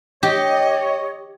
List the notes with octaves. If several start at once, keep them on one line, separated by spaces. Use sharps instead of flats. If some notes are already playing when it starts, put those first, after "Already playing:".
G4 C#5 D#5